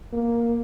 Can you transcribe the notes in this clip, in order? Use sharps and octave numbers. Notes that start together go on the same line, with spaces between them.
A#3